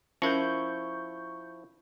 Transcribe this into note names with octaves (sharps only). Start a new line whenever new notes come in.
F3 C#4 E4 A#4 C#6 G6